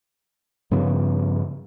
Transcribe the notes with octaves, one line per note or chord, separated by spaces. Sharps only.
G2 C#3 F3 B3